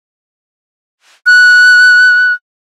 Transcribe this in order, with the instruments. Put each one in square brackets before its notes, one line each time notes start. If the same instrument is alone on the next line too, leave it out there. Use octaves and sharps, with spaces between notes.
[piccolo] F#6